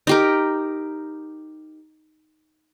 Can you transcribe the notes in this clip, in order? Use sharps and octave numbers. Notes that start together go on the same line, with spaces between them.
D#4 G4 A#4